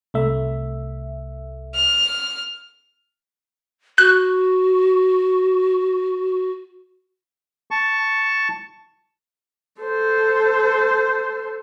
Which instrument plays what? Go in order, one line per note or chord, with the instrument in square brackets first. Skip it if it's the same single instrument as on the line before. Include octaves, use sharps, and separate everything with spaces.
[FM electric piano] C2 A3 E5
[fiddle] F6
[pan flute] F#4 [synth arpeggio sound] F#6
[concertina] A5 C#6
[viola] A4 C5